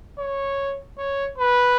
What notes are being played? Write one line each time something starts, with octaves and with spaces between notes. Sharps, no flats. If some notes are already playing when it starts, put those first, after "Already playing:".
C#5
C#5
B4